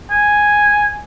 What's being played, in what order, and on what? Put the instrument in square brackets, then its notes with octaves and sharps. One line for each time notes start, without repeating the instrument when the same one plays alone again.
[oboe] G#5